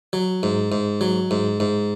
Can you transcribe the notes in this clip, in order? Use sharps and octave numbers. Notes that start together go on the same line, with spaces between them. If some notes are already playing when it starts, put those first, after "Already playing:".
F#3
G#2
G#2
F#3
G#2
G#2